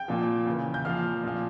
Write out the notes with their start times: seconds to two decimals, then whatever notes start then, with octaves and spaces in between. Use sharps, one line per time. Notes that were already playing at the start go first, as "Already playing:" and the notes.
Already playing: G5 G6
0.08 A#2 F3
0.46 C#3 E3
0.74 G6
0.85 A#2 F3 F5 F6
1.23 A#2 F3